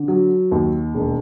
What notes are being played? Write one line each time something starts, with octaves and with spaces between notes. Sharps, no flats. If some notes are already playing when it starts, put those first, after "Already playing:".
Already playing: D3
F#3
D#2
E1